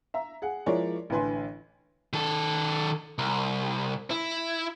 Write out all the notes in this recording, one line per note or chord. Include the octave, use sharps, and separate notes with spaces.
E5 A#5
G#4 F#5
F3 G#3 E4 A#4 C#5 D5
A1 D3 E3 B4 G#5 C6
D#3 A4
C2
E4